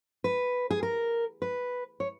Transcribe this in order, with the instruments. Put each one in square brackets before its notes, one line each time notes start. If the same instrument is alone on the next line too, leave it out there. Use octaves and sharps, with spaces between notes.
[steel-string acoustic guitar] B4
G#4
A#4
B4
C#5